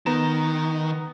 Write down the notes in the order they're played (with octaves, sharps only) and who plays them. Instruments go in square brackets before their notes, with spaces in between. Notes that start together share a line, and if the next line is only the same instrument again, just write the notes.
[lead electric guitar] D#3 [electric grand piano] B3 A#5 E7